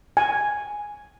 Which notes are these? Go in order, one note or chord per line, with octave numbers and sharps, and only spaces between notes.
G#5